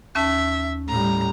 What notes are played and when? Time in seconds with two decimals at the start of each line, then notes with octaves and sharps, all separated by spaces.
0.15 D#2 C#4 E5 A5
0.88 A2 G3 A#5